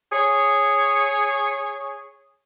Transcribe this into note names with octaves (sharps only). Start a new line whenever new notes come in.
G#4 C#5